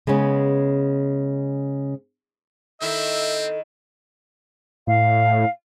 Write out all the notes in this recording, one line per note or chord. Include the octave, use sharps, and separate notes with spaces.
C#3 G#3 B3 C#4
D#3 C4 E4 A4 E5
A2 F5